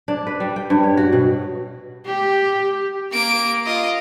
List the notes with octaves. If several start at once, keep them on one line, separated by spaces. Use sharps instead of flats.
D4
B4
G3
G5
G2
C#5
F#4
B2
G4
A#3 D7
F4 D#5